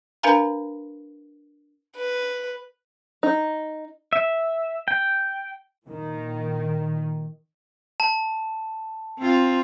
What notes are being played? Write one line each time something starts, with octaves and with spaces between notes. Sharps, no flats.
D4 A#4 B4 F5 G#5 A#5
B4
D#4
E5
G5
A#2 D#3
A5
C4 F4